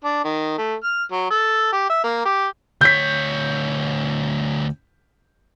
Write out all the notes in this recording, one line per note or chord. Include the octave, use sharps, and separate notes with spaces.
D4
D#3
A3
F6
F#3
A4
G4
E5
A#3
G4
D2 C#5 G6 B6